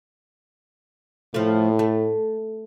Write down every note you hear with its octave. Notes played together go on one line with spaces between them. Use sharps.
A2 F3 A3
A3